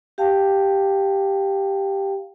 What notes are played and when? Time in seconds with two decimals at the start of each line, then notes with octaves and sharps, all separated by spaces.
0.18 G4 F5 G5 A5